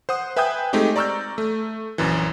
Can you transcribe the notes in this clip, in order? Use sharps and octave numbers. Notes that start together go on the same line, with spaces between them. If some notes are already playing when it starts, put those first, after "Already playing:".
C5 F#5 D#6
B4 E5 G5 G#5 D#6 G6
G#3 A3 C4 D#4 G4
D5 A#5 C#6 E6 F6 G6
A3
A#1 F#2 E3